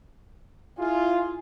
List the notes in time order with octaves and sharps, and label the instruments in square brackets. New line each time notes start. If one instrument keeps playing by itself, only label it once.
[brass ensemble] E4 F4 [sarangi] G#4